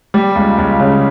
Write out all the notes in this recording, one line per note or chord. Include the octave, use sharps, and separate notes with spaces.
G3
C#2
C#2
C#3